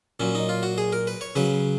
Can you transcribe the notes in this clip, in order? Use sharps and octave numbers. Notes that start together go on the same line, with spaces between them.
A#2 F#3 C#4
D#4
F4
F#4
G#4
A#4
B4
C#5
C#3 F#3 B4